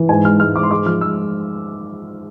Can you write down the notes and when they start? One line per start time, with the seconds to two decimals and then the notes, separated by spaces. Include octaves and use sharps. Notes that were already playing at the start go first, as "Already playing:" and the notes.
Already playing: E3
0.09 G#2 G#5
0.25 G#3 F6
0.40 G#2 F6
0.55 G#2 D6
0.63 C6
0.71 G#3 D6
0.86 F3 F6
1.01 G#3 E6